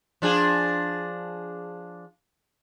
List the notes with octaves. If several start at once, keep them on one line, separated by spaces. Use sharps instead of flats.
F3 D4 G#4